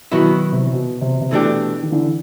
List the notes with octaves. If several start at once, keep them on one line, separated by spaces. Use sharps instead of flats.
B2 D#3 F#3 B3 E4
C3
C3
B2
C3
C3
B2 E3 A3 D4 G4
D#3
D3 E3